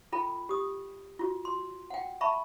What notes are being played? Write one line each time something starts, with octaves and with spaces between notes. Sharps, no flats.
F4 A4 G5 B5
G4 D#6
F4 F#4
C6
F#5 G5
E5 A5 B5 C#6